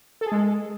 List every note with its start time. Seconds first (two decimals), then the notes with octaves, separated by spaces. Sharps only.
0.21 A4
0.26 G#4
0.32 G#3